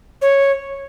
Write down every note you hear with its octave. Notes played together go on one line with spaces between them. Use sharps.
C#5